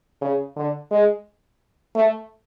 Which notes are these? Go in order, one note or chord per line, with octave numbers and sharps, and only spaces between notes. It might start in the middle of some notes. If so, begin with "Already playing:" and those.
C#3
D3
G#3
A3